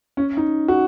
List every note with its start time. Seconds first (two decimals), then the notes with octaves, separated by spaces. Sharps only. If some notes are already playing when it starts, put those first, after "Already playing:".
0.17 C#4
0.37 D#4
0.68 F#4